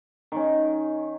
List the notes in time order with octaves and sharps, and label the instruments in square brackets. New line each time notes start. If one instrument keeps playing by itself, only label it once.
[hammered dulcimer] D#3 C#4